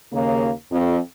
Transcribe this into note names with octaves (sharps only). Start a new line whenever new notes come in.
D#2 C#3 A#3
F2